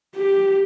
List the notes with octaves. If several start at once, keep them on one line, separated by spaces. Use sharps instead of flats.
G4